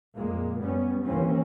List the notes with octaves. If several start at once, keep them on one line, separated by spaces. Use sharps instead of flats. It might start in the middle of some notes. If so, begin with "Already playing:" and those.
F2 A#2 G#3 A#3
F#2 G3 B3 C#4
D#2 E3 A#3 C4 C#4